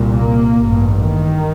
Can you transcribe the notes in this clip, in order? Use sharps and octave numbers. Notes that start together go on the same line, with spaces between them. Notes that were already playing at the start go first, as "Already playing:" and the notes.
Already playing: C2 A#2
A#3
A1 G2
D#3